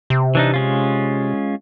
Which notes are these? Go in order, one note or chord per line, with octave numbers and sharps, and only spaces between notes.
C3
E3 D4 D#4
G#3 C#4 F4